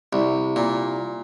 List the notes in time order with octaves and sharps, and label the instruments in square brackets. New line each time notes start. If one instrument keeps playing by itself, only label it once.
[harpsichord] C2
A#2